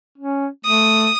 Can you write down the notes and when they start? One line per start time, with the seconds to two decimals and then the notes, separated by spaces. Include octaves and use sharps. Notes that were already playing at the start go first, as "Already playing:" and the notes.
0.18 C#4
0.65 A3 D#6